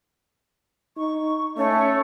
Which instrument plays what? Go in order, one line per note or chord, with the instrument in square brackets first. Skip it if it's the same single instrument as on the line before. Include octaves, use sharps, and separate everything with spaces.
[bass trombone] D#4 [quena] C#6
[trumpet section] A3 [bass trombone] C#4 [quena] C#5